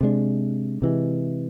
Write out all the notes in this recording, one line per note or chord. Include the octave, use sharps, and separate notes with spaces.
C3 G#3 D4
C3 E3 G#3